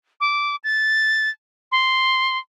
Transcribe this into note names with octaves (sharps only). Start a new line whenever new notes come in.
D6
A6
C6